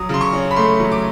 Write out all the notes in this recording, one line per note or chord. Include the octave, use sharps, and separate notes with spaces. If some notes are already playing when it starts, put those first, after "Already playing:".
Already playing: F#3 D#6
C#3 C6
C#6
C#4
B5
A3 C6
F#3
D6